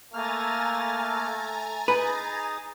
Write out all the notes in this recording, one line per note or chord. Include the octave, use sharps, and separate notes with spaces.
A3 A#3 G#5 A#5 F6 A6
D#4 G#4 B4 D#6